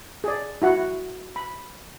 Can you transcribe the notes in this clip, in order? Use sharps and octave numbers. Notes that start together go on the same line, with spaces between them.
G#4 D5
E4 F#4 F#5
B5